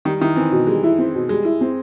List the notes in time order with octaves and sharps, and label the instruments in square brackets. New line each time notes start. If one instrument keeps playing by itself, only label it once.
[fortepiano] D#3 [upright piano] G3
[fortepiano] D#3 [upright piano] E4
[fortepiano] E3 [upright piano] C4
[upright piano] B2
[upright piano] G3 [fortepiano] G#3
[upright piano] E4
C4
B2
[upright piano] G3 [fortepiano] G#3
[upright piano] E4
C4